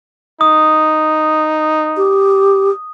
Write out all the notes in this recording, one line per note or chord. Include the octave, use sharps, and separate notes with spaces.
D#4 D#6
G4